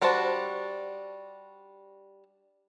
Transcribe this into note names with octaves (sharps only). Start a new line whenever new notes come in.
G3 D4 F#4 C5 A5